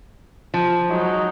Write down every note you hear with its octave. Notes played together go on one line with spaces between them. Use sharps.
F3
F#3 G#3 D#4